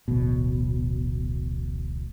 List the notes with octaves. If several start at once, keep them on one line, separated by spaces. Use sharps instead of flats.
D1 A1 B2